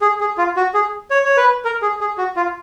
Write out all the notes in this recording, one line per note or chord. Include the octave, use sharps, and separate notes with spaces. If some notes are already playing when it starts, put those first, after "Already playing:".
G#4
G#4
F4
F#4
G#4
C#5
C#5
B4
A#4
G#4
G#4
F#4
F4